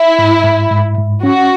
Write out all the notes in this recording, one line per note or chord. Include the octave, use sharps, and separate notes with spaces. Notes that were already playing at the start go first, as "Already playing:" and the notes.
Already playing: E4
G#2
G#2
G#2
G#2
C#4 F#4